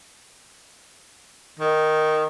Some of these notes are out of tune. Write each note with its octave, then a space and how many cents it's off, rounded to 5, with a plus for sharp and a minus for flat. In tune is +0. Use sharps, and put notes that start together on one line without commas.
D#3 -5